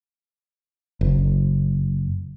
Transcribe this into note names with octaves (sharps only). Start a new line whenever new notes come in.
F#1